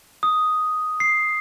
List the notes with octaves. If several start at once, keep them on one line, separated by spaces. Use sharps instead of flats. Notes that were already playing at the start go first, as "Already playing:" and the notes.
D#6
C7